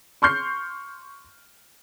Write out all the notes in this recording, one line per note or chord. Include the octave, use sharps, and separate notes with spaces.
C6 C#6 F6 G6 C7